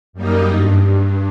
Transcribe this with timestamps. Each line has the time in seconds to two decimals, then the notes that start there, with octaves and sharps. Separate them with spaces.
0.13 F#2 G3 A#3 D#4
0.51 G2